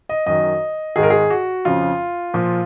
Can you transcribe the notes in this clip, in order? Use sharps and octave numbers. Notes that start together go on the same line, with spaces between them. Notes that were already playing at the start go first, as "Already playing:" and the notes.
D#5
F#2 D#3 D#5
G#2 D#3 G#4
A#4
G#4
F#4
F2 C#3 F3 F4
A#2 F3